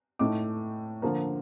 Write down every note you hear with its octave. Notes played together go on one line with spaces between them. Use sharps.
A2 A3 D#4 D6
D3 F3 A#3